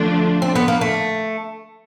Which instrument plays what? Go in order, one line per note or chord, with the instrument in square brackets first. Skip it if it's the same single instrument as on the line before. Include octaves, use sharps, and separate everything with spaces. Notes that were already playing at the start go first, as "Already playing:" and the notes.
Already playing: [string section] D3 F3 A3 D4 F4
[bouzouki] C4
B3
A#3
A3